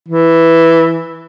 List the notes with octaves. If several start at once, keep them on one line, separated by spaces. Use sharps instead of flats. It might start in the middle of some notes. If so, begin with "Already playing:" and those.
E3